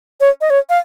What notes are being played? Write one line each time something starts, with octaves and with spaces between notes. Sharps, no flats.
C#5
D#5
C#5
F5